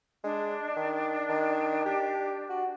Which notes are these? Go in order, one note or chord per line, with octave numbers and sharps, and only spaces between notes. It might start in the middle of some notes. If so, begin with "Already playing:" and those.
G#3 D4
D#3
D#3
G4
F#4